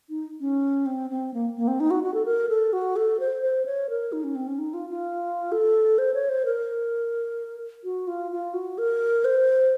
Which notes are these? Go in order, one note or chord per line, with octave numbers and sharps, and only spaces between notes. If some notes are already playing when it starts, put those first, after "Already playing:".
D#4
C#4
C4
C4
A#3
A#3
C4
D#4
F#4
F#4
A4
A#4
A4
F#4
A4
C5
C5
C#5
A#4
D#4
C#4
C4
C#4
D#4
F4
F4
A4
C5
C#5
C5
A#4
F#4
F4
F4
F#4
A#4
C5